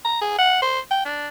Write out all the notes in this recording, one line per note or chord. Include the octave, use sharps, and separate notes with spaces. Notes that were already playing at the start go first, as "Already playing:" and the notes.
A#5
G#4
F#5
C5
G5
D4